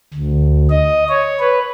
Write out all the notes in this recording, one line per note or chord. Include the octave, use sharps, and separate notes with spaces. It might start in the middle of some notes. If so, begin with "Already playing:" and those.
D2
D#5
C#5
B4